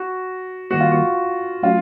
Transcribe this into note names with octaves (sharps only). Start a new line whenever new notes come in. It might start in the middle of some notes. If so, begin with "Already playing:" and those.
Already playing: F#4
D#3 G3 A#3 F#4
F4
F#4
F#3 A3 C#4 F4 F#4